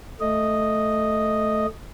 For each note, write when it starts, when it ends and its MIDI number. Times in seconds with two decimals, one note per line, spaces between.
0.20 1.66 57
0.20 1.66 75